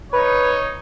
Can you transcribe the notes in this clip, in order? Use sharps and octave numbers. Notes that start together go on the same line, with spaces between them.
D#4 B4 C#5